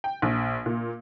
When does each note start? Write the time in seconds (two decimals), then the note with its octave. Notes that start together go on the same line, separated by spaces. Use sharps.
0.04 G5
0.22 A#1
0.66 A#2